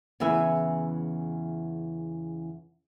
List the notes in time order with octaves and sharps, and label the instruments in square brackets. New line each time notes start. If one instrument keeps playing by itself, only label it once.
[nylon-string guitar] E2 C#3 E3 E5 G#5